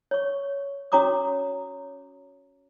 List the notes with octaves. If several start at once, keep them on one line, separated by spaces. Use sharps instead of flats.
C#5 C#6
C#4 F#4 C#5 A#5 D6 D#6